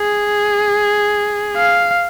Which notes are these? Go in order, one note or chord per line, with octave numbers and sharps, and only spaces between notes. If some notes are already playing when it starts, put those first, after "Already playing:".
Already playing: G#4
F5